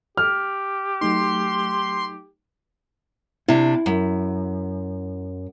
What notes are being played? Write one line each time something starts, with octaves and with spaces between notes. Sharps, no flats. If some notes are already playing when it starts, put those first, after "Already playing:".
G4 F6
F#3 A3 D#4 C6
C3 D4 E4
F#2